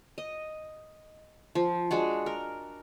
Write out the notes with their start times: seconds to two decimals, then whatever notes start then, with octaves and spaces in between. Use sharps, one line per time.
0.18 D#5
1.55 F3
1.91 G#3 D4 F#4
2.26 A#4